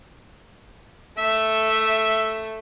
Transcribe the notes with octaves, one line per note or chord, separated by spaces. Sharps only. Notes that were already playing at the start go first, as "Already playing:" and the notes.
A3 E5